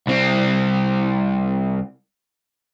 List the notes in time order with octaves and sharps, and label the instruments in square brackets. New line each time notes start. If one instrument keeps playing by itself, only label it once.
[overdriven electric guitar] C2 C4